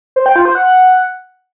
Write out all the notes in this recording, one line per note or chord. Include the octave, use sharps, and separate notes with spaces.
C5
G5
F4
C5
F#5